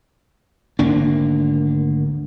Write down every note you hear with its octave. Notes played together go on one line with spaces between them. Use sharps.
G#1 D2 A#3 D4